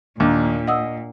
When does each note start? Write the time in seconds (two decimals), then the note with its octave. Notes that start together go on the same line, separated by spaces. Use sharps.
0.20 D#2 A#2 A#3 D4
0.67 D#5 F#5 D#6 E6